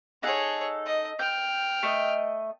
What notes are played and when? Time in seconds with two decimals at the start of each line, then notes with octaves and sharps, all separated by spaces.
0.23 D#4 G#4 A4 C#5 F#5
0.86 D#5
1.19 G5 F6 G6
1.83 A3 D#5